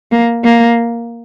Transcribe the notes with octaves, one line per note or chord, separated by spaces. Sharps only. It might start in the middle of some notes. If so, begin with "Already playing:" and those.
A#3
A#3